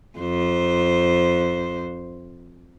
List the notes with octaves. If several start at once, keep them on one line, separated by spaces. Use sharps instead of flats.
F2 C5